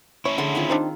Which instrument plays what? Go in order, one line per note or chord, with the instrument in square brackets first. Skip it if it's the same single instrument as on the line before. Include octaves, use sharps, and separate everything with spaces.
[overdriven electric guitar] C#4 E4 [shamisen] C#5
[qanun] D3 G#4 C6 [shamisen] A4 F#5
[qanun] D#3 C4 F4
[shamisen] D4 D#4 C5